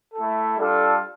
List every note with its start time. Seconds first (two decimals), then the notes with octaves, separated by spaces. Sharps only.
0.14 A3 E4 A4
0.57 G3 D4 F4 A4